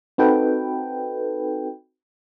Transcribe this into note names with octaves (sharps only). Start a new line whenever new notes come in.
C4 D#4 F#4 A4 B4 G5